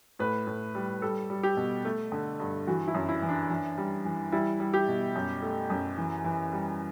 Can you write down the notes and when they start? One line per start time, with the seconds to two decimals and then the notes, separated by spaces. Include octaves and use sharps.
0.19 A2 B4
0.47 A2
0.75 G3
1.02 G3 A4
1.30 G3
1.43 G4
1.57 B2
1.85 A3
2.12 D3
2.40 G2
2.67 E3 F#4
2.88 E4
2.94 F#2
3.09 E4
3.22 E3
3.29 D4
3.50 E3
3.78 G3
4.05 E3
4.32 G3 E4
4.60 G3
4.74 G4
4.88 B2
5.15 F#2
5.42 A3
5.70 F#2
5.98 E3
6.24 E3
6.52 G3